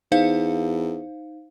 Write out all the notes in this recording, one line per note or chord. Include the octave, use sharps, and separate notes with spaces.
E2 D#4 C5 F5